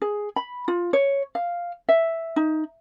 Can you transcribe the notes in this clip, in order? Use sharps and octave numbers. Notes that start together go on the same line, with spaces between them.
G#4
B5
F4
C#5
F5
E5
D#4